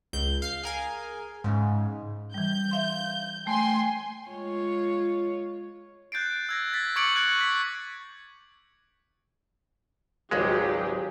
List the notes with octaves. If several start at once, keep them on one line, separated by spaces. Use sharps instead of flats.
C#2 G6
F5 C7
G#4 A#4 G#5
G#2 C#3
E3 G3 G6
E5 F5 C6
A3 G5 G#5 C6
G#3 F4 C#5
F#6 G6 A6 C7 D7
E6 G#6 A#6
A6 B6
C#6 D6 G#6 C#7 D7 F#7
F#6 G#6 C#7
B6
G#1 C#2 F#3 G#3 G4 G#4